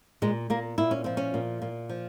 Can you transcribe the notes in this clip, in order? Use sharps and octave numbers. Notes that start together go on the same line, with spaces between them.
A#2 G#3
A#2 A#3
A#2 E4
C#4
F3 C4
C#4
A#2
A#2
F3